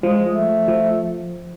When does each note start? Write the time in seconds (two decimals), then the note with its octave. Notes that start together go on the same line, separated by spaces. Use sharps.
0.03 F3 G#3
0.31 A3
0.68 F3